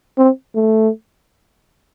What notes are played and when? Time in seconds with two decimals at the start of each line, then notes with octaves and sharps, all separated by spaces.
0.18 C4
0.55 A3